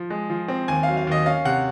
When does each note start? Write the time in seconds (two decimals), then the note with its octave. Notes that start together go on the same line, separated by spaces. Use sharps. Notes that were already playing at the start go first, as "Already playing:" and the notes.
Already playing: F3
0.10 G#3
0.30 F3
0.48 C4
0.68 D#2 G#5
0.83 F#3 F5
0.97 F5
1.07 D#2 D#5
1.26 C#4 F5
1.45 C3 F#5